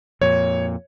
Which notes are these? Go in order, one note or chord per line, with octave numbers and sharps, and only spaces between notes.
F2 A#2 C#5